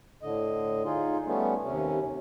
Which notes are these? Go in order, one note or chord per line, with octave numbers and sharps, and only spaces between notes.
A2 D3 D#5
D#4 F4 G#4
G3 A3 B3 C#4
D#2 C3 C#4